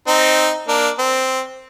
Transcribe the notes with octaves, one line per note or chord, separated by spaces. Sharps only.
C4 D#4
A#3 D4
C4